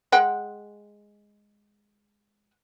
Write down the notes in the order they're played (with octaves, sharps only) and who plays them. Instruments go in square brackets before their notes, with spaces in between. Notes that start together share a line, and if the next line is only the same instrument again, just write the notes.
[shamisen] G#3 F#5 G5